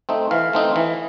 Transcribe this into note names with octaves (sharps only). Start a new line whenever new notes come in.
A3 C4 D#4
E3 F5
A3 C4 D#4
E3